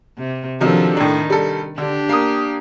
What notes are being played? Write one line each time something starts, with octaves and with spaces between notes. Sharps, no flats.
C3
C3 D#3 F3 F#3 D4 A4
A2 D#3 D4
G3 A4
D3 D4 G4
A#3 D#6